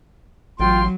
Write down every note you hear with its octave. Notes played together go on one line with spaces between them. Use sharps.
A1 F#3 F4 G5 C6